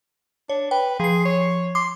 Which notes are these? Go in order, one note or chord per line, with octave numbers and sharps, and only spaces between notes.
D4 C#5
B4 G5
F3 G#4 C7
C#5
C6 D6